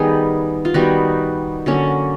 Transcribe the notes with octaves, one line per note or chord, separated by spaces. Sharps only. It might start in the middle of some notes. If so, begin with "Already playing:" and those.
Already playing: D#3 G3 B3 D#4 G#4
F4
D#3 G3 B3 D#4 F#4
D3 F#3 A#3 C#4